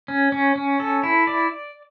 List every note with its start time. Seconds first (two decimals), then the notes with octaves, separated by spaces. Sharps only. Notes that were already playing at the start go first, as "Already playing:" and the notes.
0.08 C#4
0.32 C#4
0.56 C#4
0.80 A4
1.03 E4
1.27 D5